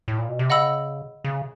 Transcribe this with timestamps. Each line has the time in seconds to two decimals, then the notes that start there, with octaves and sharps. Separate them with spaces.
0.08 A2
0.18 A#2
0.29 B2
0.39 C3
0.50 C#3 D#5 F#5 B5 E6
1.24 C#3